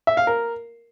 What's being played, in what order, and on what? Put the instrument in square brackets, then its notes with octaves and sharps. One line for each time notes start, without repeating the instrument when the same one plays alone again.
[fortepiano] E5
F5
A#4